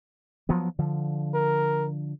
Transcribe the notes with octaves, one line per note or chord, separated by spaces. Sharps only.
F3 F#3 B3
D3 F3
A#4